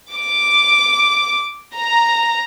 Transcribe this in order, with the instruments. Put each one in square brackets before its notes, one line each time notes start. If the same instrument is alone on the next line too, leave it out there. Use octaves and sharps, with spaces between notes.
[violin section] D6
A#5